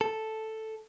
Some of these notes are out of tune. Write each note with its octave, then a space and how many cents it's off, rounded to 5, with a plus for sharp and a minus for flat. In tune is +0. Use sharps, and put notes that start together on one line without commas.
A4 +0